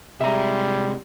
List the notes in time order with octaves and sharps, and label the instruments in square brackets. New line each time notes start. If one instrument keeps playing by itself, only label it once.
[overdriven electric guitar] C3 G#3 [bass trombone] G3 [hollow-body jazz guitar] E5 A#5